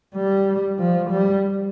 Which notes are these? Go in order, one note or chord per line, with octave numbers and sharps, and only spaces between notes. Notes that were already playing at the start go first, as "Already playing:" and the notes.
G3
F3
G3